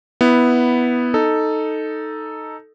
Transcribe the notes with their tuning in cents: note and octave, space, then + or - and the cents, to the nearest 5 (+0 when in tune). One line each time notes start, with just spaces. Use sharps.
B3 +0 E4 -5
D#4 +0 A4 +0